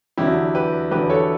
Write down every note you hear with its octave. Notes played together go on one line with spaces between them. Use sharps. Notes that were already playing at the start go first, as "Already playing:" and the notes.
E2 D3 F#3 E4 G4
G4 B4
E2 D3 F#3 G4 B4
A4 C#5